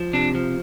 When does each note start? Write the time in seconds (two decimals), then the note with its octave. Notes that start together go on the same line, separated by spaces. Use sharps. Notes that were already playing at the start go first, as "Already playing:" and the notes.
Already playing: F3
0.13 C3 D4
0.35 F3